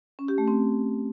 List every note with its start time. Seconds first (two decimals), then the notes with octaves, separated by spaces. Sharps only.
0.19 C#4
0.28 G4
0.38 A3
0.48 C4